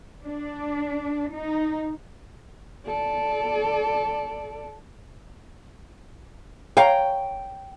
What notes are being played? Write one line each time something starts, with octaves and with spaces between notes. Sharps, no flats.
D4
D#4
A4 D5
C#5 F5 G5 A#5